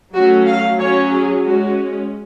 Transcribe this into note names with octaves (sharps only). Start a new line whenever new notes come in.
F#3 A3 C#4 F#4
F5
F#3 C#4 C#5
G#4
G#3 C#4 F#4